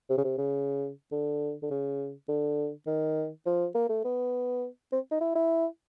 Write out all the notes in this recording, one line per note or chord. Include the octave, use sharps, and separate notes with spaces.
C3
C#3
C3
C#3
D3
D3
C#3
D3
D#3
F3
A#3
A3
B3
C4
D#4
E4
E4